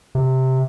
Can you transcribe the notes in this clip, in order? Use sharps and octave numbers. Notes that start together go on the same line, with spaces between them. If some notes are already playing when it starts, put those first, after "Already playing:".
C3